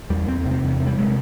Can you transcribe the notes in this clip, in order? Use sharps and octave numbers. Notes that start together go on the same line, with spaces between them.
E2 G3
E2 C4
C3
C4
E2
C3
G3
C3 G#3